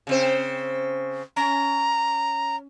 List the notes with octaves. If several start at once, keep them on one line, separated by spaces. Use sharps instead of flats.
C#3 C4 C5
C#4 A#5